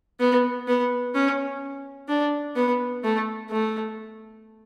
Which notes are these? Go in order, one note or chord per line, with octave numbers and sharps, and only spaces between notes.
B3
B3
C#4
D4
B3
A3
A3